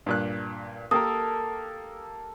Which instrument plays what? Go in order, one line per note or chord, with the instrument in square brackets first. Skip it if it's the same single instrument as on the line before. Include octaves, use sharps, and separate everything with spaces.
[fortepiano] G2 A#2 F#6
[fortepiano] A#3 G4 A#4 [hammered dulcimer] A4 [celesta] D#6